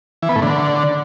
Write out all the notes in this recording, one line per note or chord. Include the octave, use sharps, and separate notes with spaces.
E3
B3
A2
D3